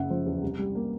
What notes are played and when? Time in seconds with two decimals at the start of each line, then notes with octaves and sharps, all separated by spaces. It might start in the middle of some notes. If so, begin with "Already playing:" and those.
Already playing: F#1 C#3 E5 F#5
0.10 F3 C5
0.26 E2
0.42 C2
0.59 G3
0.75 A#3